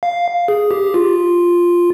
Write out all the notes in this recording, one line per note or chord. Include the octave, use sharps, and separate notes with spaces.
F5
G#4
G4
F4